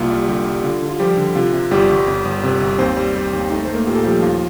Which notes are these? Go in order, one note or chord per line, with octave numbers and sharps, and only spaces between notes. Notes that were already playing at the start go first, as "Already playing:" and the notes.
Already playing: C2 A#3 F4
G3
D3 G3 G4
G3
D3 F4
D3
F4
F3 G3 G4
D3
C3 F4
C3
G1 G3 G4
G1
G1
G1
C3
G1
D#2 C4 C5
G3
G3
D#2
A3 D#4 D#5
A3 C5
A#3 A#4
A#2 G4
A4
F3 G3 G4
D#2 F4